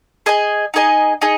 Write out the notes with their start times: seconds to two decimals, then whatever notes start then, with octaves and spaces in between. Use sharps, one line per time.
0.26 G#4 D#5 G#5
0.74 D#4 G#4 D#5 G#5
1.21 D#4 G#4 D#5